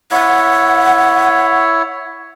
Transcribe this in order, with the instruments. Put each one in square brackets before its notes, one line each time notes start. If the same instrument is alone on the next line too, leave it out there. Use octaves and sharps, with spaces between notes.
[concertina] E4 C#5 [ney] F#5